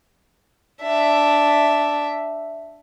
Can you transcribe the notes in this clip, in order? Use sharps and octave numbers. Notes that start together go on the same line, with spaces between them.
D4 E5